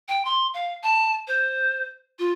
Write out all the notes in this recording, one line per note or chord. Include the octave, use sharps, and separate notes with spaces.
G5
C6
F5
A5
C5
F4